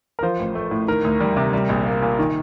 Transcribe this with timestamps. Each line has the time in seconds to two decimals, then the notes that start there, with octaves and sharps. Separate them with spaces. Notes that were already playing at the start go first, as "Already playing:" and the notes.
0.19 A#4
0.23 F3 C5
0.39 A1
0.55 A3
0.71 A2
0.88 D#3 A#4
1.04 D2
1.20 G3
1.36 C3
1.53 G3
1.69 A#1
1.86 A#3
2.02 A#2
2.19 D#3